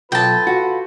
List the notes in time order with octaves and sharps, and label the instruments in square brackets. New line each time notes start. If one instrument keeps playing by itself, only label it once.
[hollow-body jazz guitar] B1 [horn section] F4 A4 B4 [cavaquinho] G5 A5
[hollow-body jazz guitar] F#4